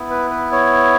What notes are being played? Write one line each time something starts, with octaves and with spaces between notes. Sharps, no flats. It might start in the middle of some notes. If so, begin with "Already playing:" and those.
Already playing: B3 E4
B4
B4
C#5